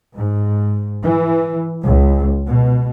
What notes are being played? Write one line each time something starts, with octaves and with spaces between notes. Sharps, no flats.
G#2
E3
C#2
B2